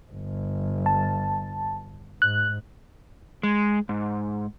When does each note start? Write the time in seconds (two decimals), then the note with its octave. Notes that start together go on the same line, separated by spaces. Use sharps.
0.11 G1
0.86 A5
2.22 G#2 F#6
3.43 G#3
3.89 G#2